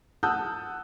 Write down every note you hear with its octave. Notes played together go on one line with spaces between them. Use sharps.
F#5 A5 D#6 E6 F#6 G6